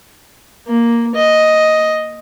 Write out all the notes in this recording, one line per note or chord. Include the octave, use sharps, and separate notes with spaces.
A#3
D#5